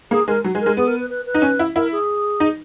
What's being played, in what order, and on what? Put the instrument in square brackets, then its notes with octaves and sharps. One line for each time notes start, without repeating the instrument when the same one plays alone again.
[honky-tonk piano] A#3 [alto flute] G#4
[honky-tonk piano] G#3 [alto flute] A#4
[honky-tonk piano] F#3
G#3
[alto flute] A#4
[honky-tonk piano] G#3
[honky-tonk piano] B3 [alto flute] G#4
[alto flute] A#4
B4
B4
B4
[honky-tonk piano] D#4
C#4
E4
[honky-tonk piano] E4 [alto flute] A#4
[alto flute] G#4
[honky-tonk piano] D#4